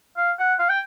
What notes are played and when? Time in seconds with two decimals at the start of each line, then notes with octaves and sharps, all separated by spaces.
0.17 F5
0.39 F#5
0.59 F5
0.69 G5